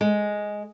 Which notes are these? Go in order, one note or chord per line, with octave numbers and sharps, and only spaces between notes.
G#3